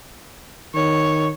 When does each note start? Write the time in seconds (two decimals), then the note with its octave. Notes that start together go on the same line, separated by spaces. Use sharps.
0.75 D#3 C#5